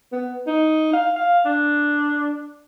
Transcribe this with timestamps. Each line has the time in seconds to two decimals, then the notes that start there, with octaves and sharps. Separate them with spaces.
0.12 B3
0.47 D#4
0.93 F5
1.16 F5
1.46 D4